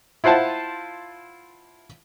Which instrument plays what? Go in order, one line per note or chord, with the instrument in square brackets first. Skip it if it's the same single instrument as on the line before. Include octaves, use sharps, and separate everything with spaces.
[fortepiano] E4 F4 C5 F#5 A5